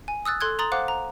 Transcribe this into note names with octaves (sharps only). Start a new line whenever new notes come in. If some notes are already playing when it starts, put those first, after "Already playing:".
G#5
D#6 E6 F#6 A6
A4 C6 F#6 G#6
A#5 C6 D#6 A6 F#7
C5 F5 F#5 D6 F#6
A#5